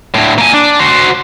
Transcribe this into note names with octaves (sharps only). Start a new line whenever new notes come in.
D2 A2
A#3 G#5
D4
F#4 C5